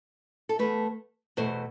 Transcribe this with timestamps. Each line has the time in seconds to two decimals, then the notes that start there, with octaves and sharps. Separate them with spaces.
0.49 A4
0.59 E2 B2 A3 B4
1.37 E2 B2 A3 C5